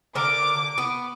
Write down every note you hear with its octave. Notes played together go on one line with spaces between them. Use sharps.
D3 A#4 D6
B3